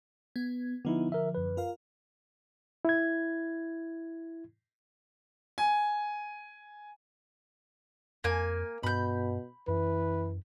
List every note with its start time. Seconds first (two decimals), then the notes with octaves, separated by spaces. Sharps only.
0.36 B3 G#6
0.85 D3 F3 B3 D#4 E4
1.12 A#4 E5
1.35 F#2 B4
1.57 F4 A#4 F5
2.85 E4 G#6
5.58 G#5
8.24 F2 A#3 G#5
8.83 G2 B2 B5 G6
9.68 F#2 E3 B4